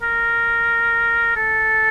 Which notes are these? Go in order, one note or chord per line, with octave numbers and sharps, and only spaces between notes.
A#4
A4